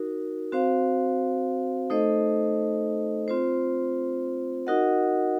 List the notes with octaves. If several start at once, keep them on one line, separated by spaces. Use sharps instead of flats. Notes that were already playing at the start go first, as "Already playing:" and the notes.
Already playing: D#4 F#4 A#4
C4 F#4 C5 F5
A3 D#4 A4 C5 D#5
C4 F4 C5
D#4 F#4 A#4 D#5 F#5